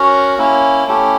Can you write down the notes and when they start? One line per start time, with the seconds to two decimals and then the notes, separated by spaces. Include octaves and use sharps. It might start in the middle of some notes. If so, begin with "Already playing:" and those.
Already playing: C#4 F#4 A#4 C#5
0.38 A#3 C#4 E4
0.87 A3 C#4 E4 G4